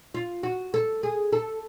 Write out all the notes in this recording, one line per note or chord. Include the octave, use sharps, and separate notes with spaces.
F4
F#4
A4
G#4
A4